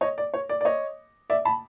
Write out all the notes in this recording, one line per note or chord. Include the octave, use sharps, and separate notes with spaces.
C#5 D#5
D5
C#5
D5
D5
C#5 D#5
D5 E5
A5 B5